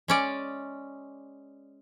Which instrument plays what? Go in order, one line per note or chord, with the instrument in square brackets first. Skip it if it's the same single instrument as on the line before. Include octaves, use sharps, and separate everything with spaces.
[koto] G#3 C#4 D5